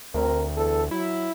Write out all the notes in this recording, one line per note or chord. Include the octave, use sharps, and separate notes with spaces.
D2 C4 A#4
E2 A4
F#3 E4